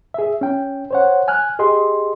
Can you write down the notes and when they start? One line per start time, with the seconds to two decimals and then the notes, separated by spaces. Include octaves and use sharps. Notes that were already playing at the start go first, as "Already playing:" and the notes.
0.14 G#4 E5
0.41 C#4 G5
0.91 C5 C#5 F#5
1.28 G#5 F6 F#6
1.59 G4 G#4 D#5 C6